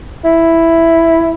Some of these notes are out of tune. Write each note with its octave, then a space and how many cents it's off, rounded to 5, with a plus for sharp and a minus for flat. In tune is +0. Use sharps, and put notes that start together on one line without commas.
E4 +5